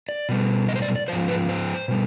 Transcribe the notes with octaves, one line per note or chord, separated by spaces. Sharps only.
D5
B2 G3
D#5
C5
D5
D5
G#2 F3 C5
B4
C5
B2 G3